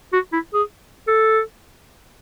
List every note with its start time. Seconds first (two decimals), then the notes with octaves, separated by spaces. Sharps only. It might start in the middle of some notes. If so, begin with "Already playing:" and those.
0.13 F#4
0.32 E4
0.54 G#4
1.08 A4